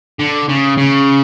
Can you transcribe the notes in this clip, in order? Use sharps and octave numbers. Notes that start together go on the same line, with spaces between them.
D3
C#3
C#3